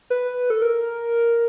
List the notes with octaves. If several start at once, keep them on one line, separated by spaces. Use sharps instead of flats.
B4
A4
A#4